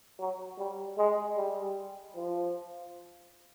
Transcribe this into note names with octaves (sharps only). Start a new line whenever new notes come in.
F#3
G3
G#3
G3
F3